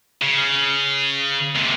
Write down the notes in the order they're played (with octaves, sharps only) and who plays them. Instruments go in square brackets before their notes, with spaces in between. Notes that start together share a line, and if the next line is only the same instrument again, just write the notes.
[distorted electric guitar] C#3
D#2 C3